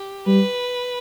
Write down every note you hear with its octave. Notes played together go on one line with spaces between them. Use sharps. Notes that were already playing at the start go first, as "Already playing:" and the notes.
Already playing: G4
G3 B4